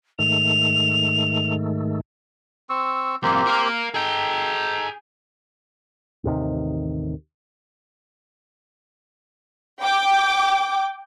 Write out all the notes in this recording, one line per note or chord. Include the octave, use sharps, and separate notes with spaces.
G#2 D#3 A3 F7
C4 C#6 E6
C2 F2 A#3 C4 G4
A#4 F5
D#4 G#4 A4 G5
A1 D#2 C3 D#3
G5 D6